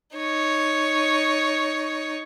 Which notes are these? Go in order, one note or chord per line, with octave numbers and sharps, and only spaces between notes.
D#4 C#5